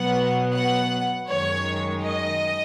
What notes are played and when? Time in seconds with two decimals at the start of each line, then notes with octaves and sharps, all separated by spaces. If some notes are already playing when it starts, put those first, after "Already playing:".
Already playing: B2 F#3 B3 F#5
0.52 F#5
1.27 F#2 D#3 G#3 C#5
2.02 D#5